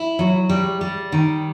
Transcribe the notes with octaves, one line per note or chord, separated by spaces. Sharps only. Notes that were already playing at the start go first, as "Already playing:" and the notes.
Already playing: E4
F#3
G3
G3
D#3